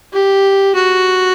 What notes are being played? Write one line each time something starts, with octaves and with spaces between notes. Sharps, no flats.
G4
F#4